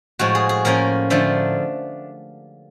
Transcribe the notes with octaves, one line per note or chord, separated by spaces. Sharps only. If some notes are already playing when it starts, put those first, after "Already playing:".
A2 F3 G#3 F#4
G#4
G#4
A2 F3 A#3 C#4 A#4
D3 F3 A3 D4